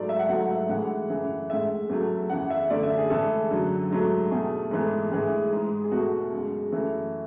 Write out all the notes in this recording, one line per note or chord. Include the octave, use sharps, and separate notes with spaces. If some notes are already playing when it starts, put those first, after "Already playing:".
Already playing: G#2 F#3 A3 D5
E5
F#5
G#2 F#3 A3 F#5
E5
A2 E3 G#3 F#5
F#2 C#3 E3 A3
A2 G#3 E5
E2 C#3 F#3 A3
F#2 C#3 E3 F#5
E5
F#2 D3 A3 D5
E5
G#4
A2 E3 G#3 A4
F#2 D3 F#3
G#2 F#3 A3
E2 B2 A3 G#4
G#2 E3 A3
A2 E3 G#3 G#4
G#2 G#3
G#4
E2 B2 A3 F#4
F#2 C#3 G#3
F#2 E3 A3